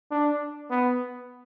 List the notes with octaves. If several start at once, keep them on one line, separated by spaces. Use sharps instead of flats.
D4
B3